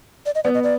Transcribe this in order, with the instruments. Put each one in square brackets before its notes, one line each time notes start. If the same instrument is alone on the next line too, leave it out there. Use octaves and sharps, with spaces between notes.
[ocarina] D5
D#5
[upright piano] B3 [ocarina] D5
[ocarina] D#5
D5